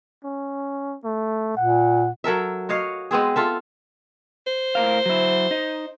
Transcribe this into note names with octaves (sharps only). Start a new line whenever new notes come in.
C#4
A3
A#2 F#5
F#3 A4 A#4 E5
F#4 C#5 D#5 F5
G#3 B3 C4 G#4
F4 A4 E5
C5
A2 A#4 F5
F#3 E4
D#4